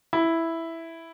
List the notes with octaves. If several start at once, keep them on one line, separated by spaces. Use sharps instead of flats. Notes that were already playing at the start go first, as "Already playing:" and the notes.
E4